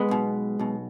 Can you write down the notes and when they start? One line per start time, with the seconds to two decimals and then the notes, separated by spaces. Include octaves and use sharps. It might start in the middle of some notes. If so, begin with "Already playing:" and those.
Already playing: G#3 B3
0.09 B1 B2
0.59 B1 B2